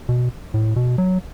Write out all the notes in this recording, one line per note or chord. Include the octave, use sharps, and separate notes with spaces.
B2
A2
B2
F#3